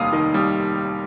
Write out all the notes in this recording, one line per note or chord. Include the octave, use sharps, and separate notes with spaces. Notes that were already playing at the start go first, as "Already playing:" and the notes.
Already playing: F1 D#2 D#3 G3 F5 D#6
D#3
G3